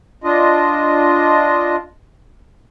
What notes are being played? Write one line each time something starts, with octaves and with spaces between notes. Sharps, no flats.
D4 F4 D#5